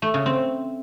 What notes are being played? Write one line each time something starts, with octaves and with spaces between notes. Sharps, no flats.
A3
C#3
C4